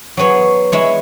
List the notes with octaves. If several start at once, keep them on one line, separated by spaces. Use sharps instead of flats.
F#3 B3 G#4 C#5
G#3 E4 C#5 E5